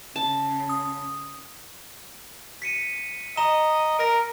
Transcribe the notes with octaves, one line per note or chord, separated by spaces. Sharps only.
C#3 A5
D#6
B6 C#7 D#7
D#5 A#5 E7 G7
A#4 A#6 D7